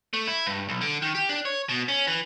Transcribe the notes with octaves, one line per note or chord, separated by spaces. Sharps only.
A3
E4
G2
B1
D3
D#3
G4
D4
C#5
B2
C#4
E3